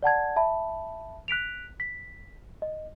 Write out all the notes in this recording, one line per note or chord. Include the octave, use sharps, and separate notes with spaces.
D5 F#5 A5 G#6
E5 A5 B5
F#6 B6 D7 F7
B6
D#5